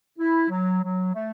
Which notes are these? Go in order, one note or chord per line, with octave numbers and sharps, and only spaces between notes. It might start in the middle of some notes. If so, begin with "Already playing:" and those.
E4
F#3
F#3
A3